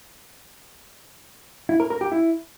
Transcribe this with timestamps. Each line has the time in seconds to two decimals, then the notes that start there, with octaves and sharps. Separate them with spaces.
1.69 E4
1.80 A#4
1.90 A#4
2.01 G4
2.12 E4